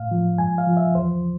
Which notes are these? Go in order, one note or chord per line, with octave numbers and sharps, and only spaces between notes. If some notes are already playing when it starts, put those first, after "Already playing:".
Already playing: A2 F5
F3
G#2 G#5
F5
F3
E5
E2 C5